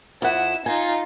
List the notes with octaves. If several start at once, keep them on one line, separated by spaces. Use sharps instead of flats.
F2 E4 F#5 E7
D#4 F4 G#5